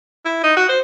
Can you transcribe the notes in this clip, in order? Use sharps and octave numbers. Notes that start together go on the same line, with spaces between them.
E4
D#4
F#4
C5